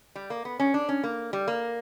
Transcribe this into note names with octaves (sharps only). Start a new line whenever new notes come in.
G3
A#3
B3
C#4
D4
C#4
A#3
G3
A#3